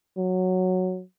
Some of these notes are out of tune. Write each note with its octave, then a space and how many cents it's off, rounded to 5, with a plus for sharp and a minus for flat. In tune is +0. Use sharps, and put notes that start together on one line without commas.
F#3 -5